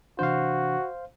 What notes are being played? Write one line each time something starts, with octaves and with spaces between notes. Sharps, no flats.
C3 E3 D4 F#4 C5 F5